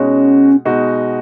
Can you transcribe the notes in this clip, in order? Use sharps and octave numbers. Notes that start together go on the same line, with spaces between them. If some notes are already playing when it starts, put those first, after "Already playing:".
Already playing: B2 G#3 C#4 D#4 F#4
B2 G#3 D#4 F#4